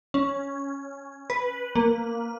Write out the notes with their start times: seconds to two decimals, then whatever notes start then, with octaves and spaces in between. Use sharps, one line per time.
0.14 C#4
1.30 B4
1.75 A#3